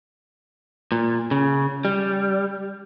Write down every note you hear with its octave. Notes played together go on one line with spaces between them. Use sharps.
A#2
C#3
G3